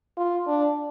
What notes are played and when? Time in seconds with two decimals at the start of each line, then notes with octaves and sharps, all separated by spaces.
0.17 F4
0.47 D4